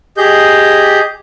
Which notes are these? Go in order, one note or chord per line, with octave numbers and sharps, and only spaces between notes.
G4 G#4 D#5 G6